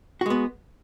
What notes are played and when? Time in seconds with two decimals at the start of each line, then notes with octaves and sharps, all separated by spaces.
0.21 F#4
0.26 G#3
0.30 B3